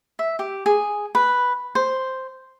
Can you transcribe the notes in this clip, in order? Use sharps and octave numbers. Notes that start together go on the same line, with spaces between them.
E5
G4
G#4
B4
C5